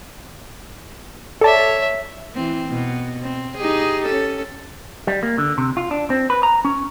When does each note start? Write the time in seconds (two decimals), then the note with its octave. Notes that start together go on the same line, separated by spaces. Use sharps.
1.41 A4 C#5 D5 E5 A5
2.35 E3 C4
2.70 B2
3.22 C4
3.57 D#4 G4 G#4
4.05 C#4 A4
5.07 G3
5.23 A#3
5.38 D3
5.58 C3
5.77 F4
5.91 D4
6.10 C4
6.30 B4
6.43 A#5
6.65 C#4